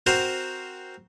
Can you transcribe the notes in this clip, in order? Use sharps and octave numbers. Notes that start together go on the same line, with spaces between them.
C4 F#4 A#4 C5